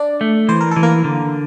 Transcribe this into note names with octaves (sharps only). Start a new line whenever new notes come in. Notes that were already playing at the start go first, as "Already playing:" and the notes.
Already playing: D4 D5
A3
E3 C5
A#4
A4
E3
A#3 A#4
D3